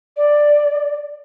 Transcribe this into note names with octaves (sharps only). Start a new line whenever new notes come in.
D5